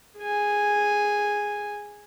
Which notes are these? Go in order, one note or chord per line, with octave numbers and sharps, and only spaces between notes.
G#4 G#5